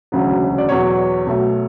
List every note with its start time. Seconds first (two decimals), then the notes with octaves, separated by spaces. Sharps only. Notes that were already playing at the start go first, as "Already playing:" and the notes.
0.12 E1 D2 C#3 F#3
0.58 D5
0.69 E2 B2 F#3 C#5
1.26 B1 B2 A3